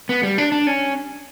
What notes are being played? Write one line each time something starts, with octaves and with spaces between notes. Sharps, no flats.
B3
G3
D4
D4
C#4